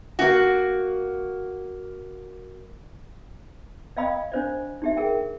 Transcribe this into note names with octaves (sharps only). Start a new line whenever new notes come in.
A#3 F#4
D5 D#5 F5 G5 B5 D#6
D4 C5 D5
D#4 G4 E5
G#4 A#4 G5